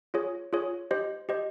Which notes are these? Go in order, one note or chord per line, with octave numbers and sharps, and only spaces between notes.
F4 G#4 C#5
F4 G#4 C#5
G4 C5 D#5
G4 C5 D#5